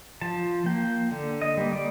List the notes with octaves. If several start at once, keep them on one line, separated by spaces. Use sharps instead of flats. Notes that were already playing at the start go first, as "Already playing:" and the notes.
F3 A5
A#3 G5
D3
D#5
G3 A#3
D5